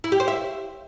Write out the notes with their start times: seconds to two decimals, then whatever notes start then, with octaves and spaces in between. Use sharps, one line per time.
0.04 E4
0.12 G4
0.20 C5
0.28 E5